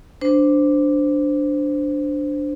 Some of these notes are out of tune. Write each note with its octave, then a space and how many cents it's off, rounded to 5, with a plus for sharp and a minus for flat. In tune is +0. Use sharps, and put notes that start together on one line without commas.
D4 +0 C5 -10